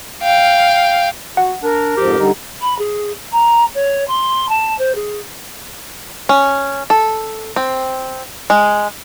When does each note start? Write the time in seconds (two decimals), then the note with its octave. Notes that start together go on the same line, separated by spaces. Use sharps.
0.22 F5 G5
1.37 F#4 F#5
1.63 D4 A#4
1.97 F2 G#2 F3 G4
2.17 D3 G3 D#4
2.61 B5
2.78 G#4
3.31 A#5
3.74 C#5
4.07 C6
4.48 A5
4.78 C5
4.95 G#4
6.29 C#4
6.90 A4
7.56 C4
8.50 G#3